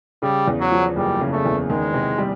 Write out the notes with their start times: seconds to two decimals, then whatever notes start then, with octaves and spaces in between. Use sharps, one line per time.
0.22 C#3 G3
0.47 E2
0.60 F#3
0.71 F3
0.96 F#1 G3
1.21 C#3
1.33 A3
1.46 E2
1.70 D#3 G#3
1.94 C3
2.18 G3